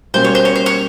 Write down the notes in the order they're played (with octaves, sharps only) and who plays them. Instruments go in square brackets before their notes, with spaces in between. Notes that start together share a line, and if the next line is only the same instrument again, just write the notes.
[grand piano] B2 G3 A#3 C#4 [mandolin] C5
[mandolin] C#5
C5
C#5
C5
C#5